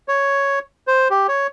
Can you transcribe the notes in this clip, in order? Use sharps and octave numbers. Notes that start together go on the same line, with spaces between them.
C#5
C5
G4
C#5